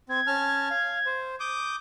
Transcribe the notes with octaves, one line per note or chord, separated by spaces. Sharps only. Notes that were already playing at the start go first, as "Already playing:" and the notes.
C4 G#6
C#4 A5 F6
F5
C5
D6 D#6 G6